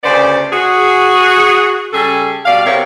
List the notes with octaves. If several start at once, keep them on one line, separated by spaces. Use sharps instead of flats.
D2 C#3 B3 C5 D5
F#4 G#4
C#3 G3 G#4 A4
B2 G3 D5 F5
C3 B3 E4 G4 A#4 C#5